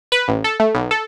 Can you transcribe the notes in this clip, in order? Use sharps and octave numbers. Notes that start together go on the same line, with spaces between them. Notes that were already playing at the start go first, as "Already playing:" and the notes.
B4
A1
A4
A3
B1
A4